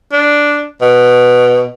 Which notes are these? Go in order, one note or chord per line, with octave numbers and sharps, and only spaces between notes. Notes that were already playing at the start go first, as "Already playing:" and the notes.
D4
B2